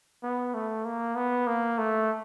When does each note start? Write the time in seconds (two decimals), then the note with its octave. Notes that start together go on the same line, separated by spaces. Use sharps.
0.23 B3
0.54 A3
0.85 A#3
1.16 B3
1.47 A#3
1.78 A3